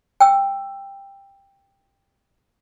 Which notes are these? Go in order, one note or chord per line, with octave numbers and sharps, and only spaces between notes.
G5 E6